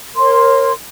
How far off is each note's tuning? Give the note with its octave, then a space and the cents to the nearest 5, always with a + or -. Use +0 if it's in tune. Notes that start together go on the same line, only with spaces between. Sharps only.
A#4 +0 C#5 -35 C6 +0